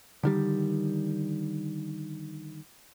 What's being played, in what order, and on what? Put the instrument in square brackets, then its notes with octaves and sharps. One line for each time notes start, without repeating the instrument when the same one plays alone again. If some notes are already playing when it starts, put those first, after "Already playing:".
[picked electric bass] D3 D#3 G3